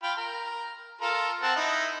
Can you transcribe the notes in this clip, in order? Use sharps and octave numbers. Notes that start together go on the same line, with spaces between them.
F4 G5 B5
A#4
F4 A4 A#4
C4 F#5 A5
D#4 E4